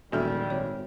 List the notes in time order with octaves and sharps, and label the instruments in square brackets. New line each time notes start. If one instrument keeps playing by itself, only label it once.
[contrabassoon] E1 [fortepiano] A#1 E5 F6 [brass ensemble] D#3 G3 [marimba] F#4 A4
[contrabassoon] G#1 [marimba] C#5